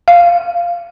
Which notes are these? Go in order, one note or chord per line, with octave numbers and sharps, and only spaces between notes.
F5